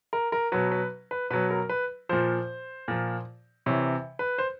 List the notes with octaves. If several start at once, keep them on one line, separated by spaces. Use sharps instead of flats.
A#4
A#4
B2 F#3 B4
B4
B4
B2 F#3 B4
A#4
B4
A#2 F3 C5
A#2 F3
C3 E3 C#5
B4
C5